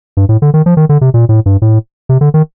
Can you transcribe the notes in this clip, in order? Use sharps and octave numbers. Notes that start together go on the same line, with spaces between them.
G2
A2
D3
D#3
F3
D#3
D3
C3
A#2
A2
G2
A2
C3
D3
D#3